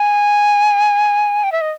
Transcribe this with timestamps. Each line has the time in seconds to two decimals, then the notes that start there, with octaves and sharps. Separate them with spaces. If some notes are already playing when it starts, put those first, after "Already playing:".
Already playing: G#5
1.44 G5
1.52 E5
1.61 D#5